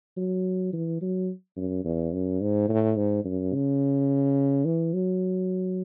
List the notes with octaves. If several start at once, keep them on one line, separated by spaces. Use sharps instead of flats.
F#3
E3
F#3
F#2
E2
F#2
G#2
A2
G#2
F#2
C#3
E3
F#3